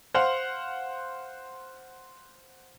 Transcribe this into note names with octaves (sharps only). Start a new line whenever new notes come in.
C5 F5 F#5 C6